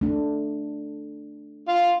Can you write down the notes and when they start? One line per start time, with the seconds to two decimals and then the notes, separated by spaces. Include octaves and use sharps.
0.01 A3 D4
1.68 F4 F5